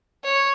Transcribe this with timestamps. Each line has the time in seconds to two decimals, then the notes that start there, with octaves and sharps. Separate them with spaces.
0.24 C#5